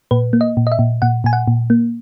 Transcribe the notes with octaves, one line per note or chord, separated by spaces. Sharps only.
A#2 B4
A#3
D#5
A#2
D#5
E5
A#2
A#2 F#5
A#2 G#5
F#5
A#2
A#3